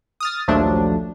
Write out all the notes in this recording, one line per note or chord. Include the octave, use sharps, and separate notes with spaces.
D#6 F6 A6
A#1 D#2 F3 F#3 A3 D4